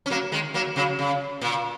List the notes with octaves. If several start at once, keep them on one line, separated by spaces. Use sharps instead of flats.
C#4
F#3 A#3
D#3 G#3
F#3 A#3
C#3 F#3
C#3
A#2